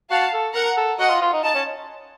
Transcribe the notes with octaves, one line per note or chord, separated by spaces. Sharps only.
F#4 F5 A5
A4
A#4 F#5 A#5
A4
F#4 D#5 F#5
F4
F4
D#4
D#4 A5
C#4